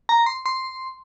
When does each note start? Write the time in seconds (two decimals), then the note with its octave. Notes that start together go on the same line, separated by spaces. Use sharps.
0.09 A#5
0.26 C6
0.46 C6